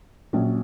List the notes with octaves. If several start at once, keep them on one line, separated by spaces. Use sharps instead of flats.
A#1 A#2 F#3 C#4